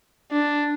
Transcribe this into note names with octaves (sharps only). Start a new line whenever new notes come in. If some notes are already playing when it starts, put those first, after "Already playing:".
D4